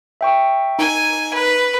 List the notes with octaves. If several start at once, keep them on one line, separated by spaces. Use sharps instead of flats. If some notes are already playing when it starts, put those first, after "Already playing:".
E5 G5 C#6
D#4 G#5
B4